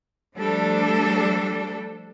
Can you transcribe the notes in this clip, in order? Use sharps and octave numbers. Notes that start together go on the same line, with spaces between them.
F3 G3 A3 D4 A4